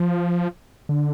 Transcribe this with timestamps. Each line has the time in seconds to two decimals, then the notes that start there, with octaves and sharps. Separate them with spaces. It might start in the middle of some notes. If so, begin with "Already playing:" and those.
Already playing: F3
0.89 D3